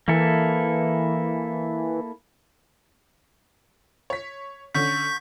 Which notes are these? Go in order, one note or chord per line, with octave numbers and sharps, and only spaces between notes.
E3 A#3 E4 A4
C#5 B6
D3 C#4 C#6 G6 B6